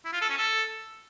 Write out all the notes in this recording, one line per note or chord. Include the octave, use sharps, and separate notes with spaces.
E4
F4
A4
C#4
A4